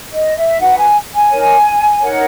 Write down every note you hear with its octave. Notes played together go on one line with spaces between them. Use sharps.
D#5
E5
D#4 F#4 B4 F#5
G#5
G#5
D#4 A#4 C#5
D#4 A#4 C#5 F#5